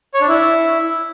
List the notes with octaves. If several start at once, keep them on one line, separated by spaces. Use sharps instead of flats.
C#5
D4
E4